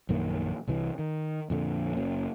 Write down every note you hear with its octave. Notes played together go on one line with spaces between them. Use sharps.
A#1 F#2 D#3 A#3
C2 C3 E3
D#3
F2 A#2 D3
F#1 F#3 A#3 C#4